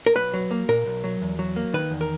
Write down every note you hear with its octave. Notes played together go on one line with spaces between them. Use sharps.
A#4
B1 B4
F#3
A#3
A#2 A#4
B1
F#3
E2
F#3
A#3
D#3 B4
E2
A#4